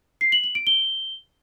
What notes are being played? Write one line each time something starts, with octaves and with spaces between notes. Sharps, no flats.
C7
F#7
F#7
D7
G7